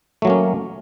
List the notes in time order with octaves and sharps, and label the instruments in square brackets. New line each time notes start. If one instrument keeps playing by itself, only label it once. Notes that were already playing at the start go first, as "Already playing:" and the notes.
[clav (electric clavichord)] A3
F#3
A#3
C#4